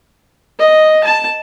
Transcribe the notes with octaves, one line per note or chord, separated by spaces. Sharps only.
D#5
A5